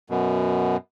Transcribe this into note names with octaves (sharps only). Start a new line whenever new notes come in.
F#2 B2